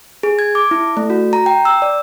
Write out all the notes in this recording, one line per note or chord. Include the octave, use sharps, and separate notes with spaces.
G#4
G#6
D6
E4
A3
F#4
A#5
G5
E6
D5